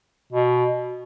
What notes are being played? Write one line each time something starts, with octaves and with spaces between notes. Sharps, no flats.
B2